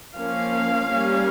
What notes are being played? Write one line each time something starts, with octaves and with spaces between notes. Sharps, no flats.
F3 A#3 C#4 F5
G3 A#3 C#4